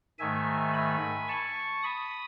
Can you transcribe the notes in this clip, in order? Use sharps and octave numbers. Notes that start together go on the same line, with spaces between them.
G#2 D#3 A3 E5 G#5
G#5 B5
A5 C#6
B5 D#6